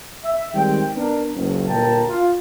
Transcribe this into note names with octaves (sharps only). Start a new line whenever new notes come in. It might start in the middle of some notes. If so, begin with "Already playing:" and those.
E5
D#3 G3 G#3 C4 G5
B3 D4 A#4
F#1 C#2
G1 A#2 A#4 G5 A5 A#5
F4